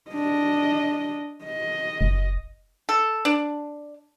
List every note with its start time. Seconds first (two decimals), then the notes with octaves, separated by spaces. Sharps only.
0.11 D4 D#5
1.45 D#5
2.01 F#1
2.89 A4
3.25 D4